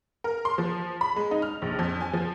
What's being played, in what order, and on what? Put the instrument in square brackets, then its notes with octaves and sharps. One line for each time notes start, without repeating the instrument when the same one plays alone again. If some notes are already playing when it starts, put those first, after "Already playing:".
[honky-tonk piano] A#4
C6
F3
B5
G#3
D#4
F6
A#1
F2
G#5
F3